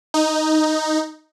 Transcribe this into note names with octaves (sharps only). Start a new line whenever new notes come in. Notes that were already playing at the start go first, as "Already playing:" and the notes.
D#4